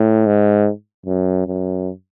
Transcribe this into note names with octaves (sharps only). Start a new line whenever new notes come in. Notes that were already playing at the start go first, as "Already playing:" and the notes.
Already playing: A2
G#2
F#2
F#2